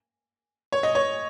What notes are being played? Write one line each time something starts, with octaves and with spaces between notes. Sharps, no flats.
C#5
D#5
C#5